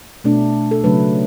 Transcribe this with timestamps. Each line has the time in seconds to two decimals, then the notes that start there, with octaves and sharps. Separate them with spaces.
0.24 B2 A3 D4
0.71 A4
0.84 C#3 F#3 A3 D4 B4